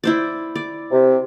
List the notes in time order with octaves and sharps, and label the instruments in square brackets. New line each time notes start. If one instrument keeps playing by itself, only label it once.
[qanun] E4 C5 D5
D5
[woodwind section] C3